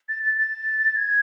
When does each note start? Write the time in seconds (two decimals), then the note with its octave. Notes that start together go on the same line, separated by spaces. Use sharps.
0.09 A6
0.23 A6
0.38 A6
0.97 G#6